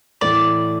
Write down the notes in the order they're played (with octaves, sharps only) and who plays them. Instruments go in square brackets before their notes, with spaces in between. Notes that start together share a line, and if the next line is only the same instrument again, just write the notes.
[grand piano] A2 E3 A3 [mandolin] D5